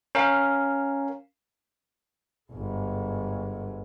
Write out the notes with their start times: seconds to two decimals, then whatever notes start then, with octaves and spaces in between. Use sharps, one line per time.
0.15 C#4 A#4 F5
2.51 G1 G#2